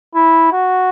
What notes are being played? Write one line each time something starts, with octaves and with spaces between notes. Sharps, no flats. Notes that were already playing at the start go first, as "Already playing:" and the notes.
E4
F#4